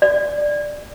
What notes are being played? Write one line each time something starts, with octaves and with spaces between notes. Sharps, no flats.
D5